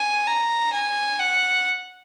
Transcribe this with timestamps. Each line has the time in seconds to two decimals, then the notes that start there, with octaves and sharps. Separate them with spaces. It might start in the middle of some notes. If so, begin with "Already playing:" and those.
Already playing: G#5
0.27 A#5
0.73 G#5
1.19 F#5